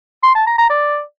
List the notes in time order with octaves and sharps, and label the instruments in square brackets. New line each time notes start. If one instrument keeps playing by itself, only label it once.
[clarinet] C6
A5
A#5
A#5
D5